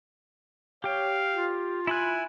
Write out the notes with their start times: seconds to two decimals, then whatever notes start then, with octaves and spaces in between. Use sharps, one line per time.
0.84 G4 C#5 F5 G5
1.33 F4
1.87 E4 G#5 B5 F#6